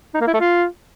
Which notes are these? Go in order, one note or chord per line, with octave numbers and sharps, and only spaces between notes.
D#4
A#3
E4
A3
F4